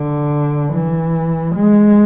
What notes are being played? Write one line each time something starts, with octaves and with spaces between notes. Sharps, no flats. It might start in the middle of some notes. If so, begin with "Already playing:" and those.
Already playing: D3
E3
G#3